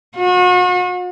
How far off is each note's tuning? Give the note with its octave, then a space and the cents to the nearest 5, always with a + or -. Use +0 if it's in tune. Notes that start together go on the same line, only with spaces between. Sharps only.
F#4 -40